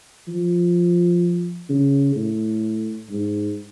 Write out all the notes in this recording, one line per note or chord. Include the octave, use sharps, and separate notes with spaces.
F3
C#3
A2
G#2